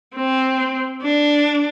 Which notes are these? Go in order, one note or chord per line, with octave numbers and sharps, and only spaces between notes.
C4
D4